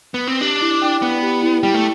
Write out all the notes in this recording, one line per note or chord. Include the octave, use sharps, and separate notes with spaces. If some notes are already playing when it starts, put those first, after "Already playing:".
B3
C4
D4 G4
E4
G5
B3 D5
G4
E4
G3 G5
A3